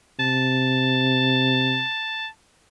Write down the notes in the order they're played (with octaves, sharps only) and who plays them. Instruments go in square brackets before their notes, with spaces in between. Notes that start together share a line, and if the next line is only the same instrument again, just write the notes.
[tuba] C3 [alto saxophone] A5